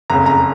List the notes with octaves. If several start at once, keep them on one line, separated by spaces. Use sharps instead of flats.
F#1 F2 C#3 A#5
A#5